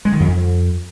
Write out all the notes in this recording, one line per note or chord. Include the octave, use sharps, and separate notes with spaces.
G#3
D#3
F2